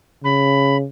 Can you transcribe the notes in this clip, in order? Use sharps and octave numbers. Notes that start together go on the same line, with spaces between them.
C#3 B5